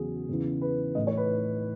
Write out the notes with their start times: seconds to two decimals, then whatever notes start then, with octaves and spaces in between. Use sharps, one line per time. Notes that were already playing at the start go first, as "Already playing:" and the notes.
Already playing: E2 C#3 F#3 G#4
0.29 E2 C#3 E3
0.61 B4
0.95 A2 E3 D#5
1.07 C#5
1.17 B4